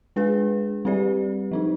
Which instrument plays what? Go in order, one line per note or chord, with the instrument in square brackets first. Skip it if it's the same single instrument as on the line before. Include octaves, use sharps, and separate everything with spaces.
[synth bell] G#3 D4 G#4 B4
G3 C4 G4 B4 D5
F3 C4 D#4